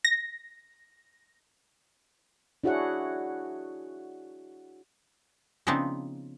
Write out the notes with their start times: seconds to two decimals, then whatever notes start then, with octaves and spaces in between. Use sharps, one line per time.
0.05 A#6
2.64 D4 E4 F#4 G#4 C#5 F#5
5.67 C#3 F3 B3 C4 D4 D#4